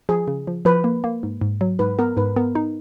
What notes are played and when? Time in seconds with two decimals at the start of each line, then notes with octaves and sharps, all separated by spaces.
0.09 F3 G#4
0.27 C#3
0.47 F3
0.65 F3 B4
0.84 A#3
1.04 A#3
1.23 G#2
1.41 G#2
1.61 F#3
1.79 G#2 B4
1.99 B3 A#4
2.17 G#2 B4
2.36 B3 A#4
2.55 D#4